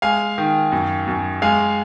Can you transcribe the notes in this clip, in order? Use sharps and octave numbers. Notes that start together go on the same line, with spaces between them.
G#3 F5 G#5
D#3
F#2
F#2
G#3 F5 G#5